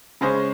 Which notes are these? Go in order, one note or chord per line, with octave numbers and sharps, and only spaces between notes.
C#3 G#3 C#4 G#4 C5